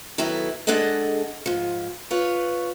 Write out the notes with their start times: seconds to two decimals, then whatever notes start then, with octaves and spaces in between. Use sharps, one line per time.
0.18 D#3 F#3 B3 E4 A4
0.67 G#3 D4 G#4 A4 D#5 F#5
1.46 G#2 F3
2.11 F4 B4 C#5